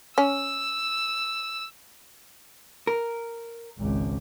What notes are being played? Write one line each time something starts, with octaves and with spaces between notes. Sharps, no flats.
C#4 E6
A#4
G#1 C#2